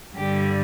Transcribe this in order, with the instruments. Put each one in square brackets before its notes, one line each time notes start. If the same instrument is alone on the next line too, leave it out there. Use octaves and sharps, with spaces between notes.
[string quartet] G2 D3 G3 G4